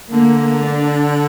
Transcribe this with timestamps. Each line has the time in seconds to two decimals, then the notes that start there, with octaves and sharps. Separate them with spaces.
0.12 D3 A#3
0.66 D4